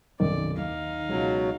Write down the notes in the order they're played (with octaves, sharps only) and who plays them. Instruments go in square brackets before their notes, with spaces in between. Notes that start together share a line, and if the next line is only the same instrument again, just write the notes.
[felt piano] B1 F#2 C3 [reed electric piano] D#3 [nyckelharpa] D5
[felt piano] D#2 [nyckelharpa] D#4 F5
[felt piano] C#2 [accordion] B2 F#3